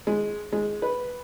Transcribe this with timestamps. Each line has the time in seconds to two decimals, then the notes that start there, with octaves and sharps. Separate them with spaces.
0.07 G#3
0.53 G#3
0.82 B4